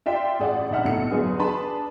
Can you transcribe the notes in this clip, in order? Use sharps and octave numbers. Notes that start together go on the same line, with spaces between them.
F4 D5 E5 G5 C6
A1 G#4 D5 F#5
A#1 G2 D#4 E5 F#5 F6
B1 A2 D#4 A4 C#7
G1 E2 F#3 G#4 B4
D4 G#4 B4 A5 B5